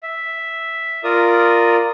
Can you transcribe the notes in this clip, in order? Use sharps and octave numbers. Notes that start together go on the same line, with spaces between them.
E5
F4 A#4 D5 D#6